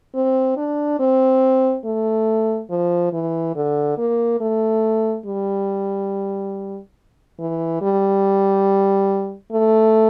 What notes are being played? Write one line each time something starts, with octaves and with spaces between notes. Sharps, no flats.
C4
D4
C4
A3
F3
E3
D3
A#3
A3
G3
E3
G3
A3